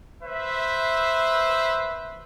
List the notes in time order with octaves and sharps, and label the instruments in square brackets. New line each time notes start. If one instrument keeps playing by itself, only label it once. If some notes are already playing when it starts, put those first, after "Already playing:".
[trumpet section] B4 C5 E5